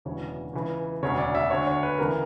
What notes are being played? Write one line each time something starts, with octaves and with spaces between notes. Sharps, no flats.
E1 D2 C#3 E3 C#5
C#2 C#3 E3
E1 D2 C#3 C#5
D5
E5
D2 D3 C#5
C#5
B4
D2 C#3 E3 A#4